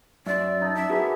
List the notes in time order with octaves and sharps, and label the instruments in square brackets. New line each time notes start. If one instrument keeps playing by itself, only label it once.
[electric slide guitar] F#2 [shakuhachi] D5 [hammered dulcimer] E5 C6
[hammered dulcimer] D#4 A4
[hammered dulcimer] D4 [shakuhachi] E5
[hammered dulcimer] E3 B3 A#5 [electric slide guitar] F#4 G#4 A#4